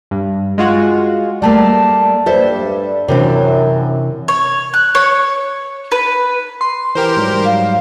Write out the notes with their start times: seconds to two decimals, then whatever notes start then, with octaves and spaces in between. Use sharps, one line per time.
0.11 G2
0.58 G#3 F4 F#4
1.42 G3 A3 A#3 D5 A5
2.26 G2 G3 A4 C5 E5
3.08 F#2 C3 E3 D4
4.28 C#5
4.74 F#6
4.95 C#5
5.92 B4
6.61 C6
6.95 E3 G4 A#4 C5
7.17 G#2 F#3 G3
7.45 F5